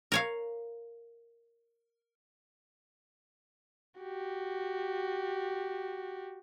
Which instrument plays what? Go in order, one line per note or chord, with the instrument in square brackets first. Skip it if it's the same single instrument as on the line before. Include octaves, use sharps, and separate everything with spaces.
[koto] A#4 C#5 F5
[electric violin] F#4 G4